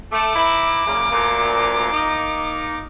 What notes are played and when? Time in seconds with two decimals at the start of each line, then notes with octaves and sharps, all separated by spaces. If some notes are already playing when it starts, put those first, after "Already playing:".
0.12 A3 D6
0.35 E3 D#4 E4
0.86 F#2 A#2 C#3
1.11 D2 A#2
1.91 D#3 A#3 D#4